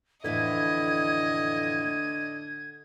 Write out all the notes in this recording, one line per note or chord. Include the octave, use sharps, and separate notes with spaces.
F2 A2 D3 E3 D#5 G#6